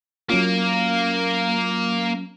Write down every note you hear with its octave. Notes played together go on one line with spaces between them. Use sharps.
F#3 A#3 C#4 F4